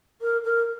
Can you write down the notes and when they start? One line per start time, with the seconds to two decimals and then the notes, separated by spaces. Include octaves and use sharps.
0.21 A#4
0.44 A#4